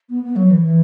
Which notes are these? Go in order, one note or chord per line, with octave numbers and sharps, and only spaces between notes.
B3
B3
F#3
E3
E3